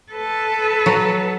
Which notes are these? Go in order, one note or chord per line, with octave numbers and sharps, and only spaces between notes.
A4 B4
F#3